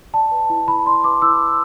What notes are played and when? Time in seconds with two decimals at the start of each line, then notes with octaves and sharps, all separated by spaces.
0.13 D5 A5
0.31 B4
0.50 E4
0.67 E4 B5
0.86 D5 C6
1.04 B4 D6
1.22 E4 E6
1.41 E4